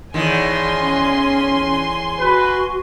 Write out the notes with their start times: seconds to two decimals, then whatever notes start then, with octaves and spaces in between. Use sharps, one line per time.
0.14 E2 A2 D#3 G#5 C6
0.79 C#4
2.20 F#4 B4